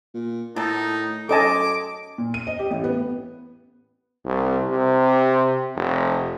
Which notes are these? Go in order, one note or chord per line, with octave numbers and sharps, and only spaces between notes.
A#2
A2 D#3 D#4 A4
F#2 C#3 C4 A4 D#5 G#5 A5 D6
A#2
D#7
D#5
G4
A1
B3
C2
C3
F1